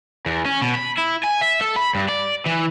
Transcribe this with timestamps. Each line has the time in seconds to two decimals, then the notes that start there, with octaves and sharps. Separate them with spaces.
0.26 E2
0.46 C#4
0.62 B2
0.75 B5
0.97 E4
1.24 G#5
1.41 E5
1.61 A4
1.76 B5
1.95 G2
2.09 D5
2.46 E3